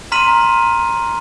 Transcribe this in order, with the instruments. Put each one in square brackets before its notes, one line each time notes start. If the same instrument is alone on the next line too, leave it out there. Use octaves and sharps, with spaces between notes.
[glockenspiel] A#5 C6 F6 B6 D#7 F#7